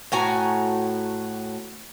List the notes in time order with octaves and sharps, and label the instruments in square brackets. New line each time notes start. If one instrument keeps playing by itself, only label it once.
[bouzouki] A2 F#4 G#5 A#5